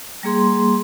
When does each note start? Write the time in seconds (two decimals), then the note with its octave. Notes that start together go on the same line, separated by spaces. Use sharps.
0.23 G3 A#3 G#4 C6